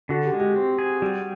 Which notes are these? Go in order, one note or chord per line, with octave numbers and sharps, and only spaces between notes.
D3 F#4
G4
G#3
G4
C4
G#4
G3 F#4